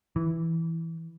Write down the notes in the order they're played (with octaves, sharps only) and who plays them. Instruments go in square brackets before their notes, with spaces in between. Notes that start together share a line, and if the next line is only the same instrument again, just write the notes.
[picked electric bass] E3